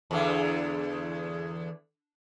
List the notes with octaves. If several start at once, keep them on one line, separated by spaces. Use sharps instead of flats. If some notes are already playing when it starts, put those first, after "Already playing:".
E2 D3